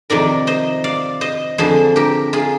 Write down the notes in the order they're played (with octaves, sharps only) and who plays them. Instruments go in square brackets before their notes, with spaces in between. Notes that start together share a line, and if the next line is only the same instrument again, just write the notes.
[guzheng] F2 C3 D#3 A#4 D5
C5 D#5
D5 F5
C5 D#5
F2 D3 F3 G#4 C5
G4 A#4
F4 G#4